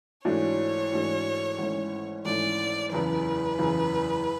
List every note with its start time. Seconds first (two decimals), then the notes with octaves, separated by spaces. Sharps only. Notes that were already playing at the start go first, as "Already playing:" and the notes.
0.25 G#2 E3 A3 D4 F#4 C#5
0.92 G#2 E3 A3 D4 F#4
1.58 G#1 G#2 E3 A3 C#4
2.25 G#1 G#2 E3 A3 C#4 D5
2.92 F#1 E2 C#3 E3 B4
3.59 F#1 E2 C#3 E3